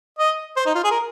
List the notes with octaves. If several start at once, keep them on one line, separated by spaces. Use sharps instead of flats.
D#5
C5
D#4
F4
G#4
A#4